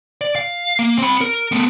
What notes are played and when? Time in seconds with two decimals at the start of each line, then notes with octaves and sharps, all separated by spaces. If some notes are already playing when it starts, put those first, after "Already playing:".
0.21 D5
0.35 F5
0.79 A#3
0.98 C4 B5
1.21 A#4
1.52 A3 B3